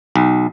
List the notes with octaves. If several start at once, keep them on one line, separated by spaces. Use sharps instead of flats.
B1